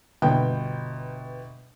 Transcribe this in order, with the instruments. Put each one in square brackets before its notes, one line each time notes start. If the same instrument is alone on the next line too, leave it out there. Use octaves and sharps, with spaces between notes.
[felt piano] G1 B2 G5